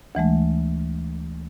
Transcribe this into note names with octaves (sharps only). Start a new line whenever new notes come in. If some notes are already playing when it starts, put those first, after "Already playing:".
D2 E3 G#3 A3